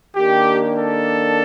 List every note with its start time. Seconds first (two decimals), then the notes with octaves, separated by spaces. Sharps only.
0.15 D#3 A#3 D4 G4
0.78 A4